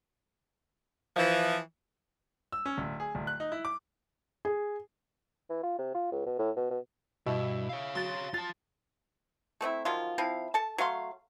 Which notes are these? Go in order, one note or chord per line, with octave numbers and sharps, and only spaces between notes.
E3 F3
E6
C#4
D1
G#4
D1
F#6
D#4
E4
D6
G#4
E3
F4
C3
F4
C#2
B2
A2
B2
B2
G2 B2 E4
C#5 F5
F#3 C6 A6
F4 A5 A6
A3 C4 D#4 E4
D#3 F3 F#3 F4
F3 C4 E4 F5
A4 A5
F#3 A3 F5 C6